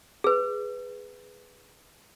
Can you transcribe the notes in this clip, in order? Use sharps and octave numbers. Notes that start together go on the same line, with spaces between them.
G#4 B4